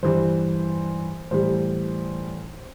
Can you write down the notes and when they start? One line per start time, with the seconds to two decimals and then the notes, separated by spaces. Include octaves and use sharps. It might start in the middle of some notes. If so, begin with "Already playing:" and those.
0.03 G2 E3 G3 C5
1.31 A2 E3 G3 C5